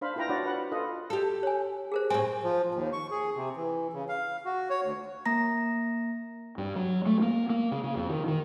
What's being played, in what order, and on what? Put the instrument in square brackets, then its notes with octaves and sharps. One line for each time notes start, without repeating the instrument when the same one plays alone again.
[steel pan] D4 C5 F5 B5
E4 F4 B4 G5 A#5
D4 F#4 C#5 D5 F#5
B4 F#5
F4 A4 B4 D#5
[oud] G4 A4
[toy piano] C#5 G#5
G#4 A#4 C5
[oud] A2 C4 [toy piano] G#5
[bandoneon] F3
D#2
C#6
G#4
C3
E3
C#3
F5
F#4
C#5
D2
[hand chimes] A#3 A#5 A#6
[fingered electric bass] G2
F#3
A3
A#3
A#3
C#3
C#3
F2
D#3
D#3